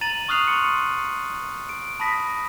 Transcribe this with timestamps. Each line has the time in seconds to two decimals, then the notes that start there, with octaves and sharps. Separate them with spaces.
0.01 A#5 A6 D#7 F#7
0.28 C#6 D#6 F6 F#6 C7 F7
0.48 C6 C#7
1.69 D7
2.00 A5 B5 D#6 A#6 B6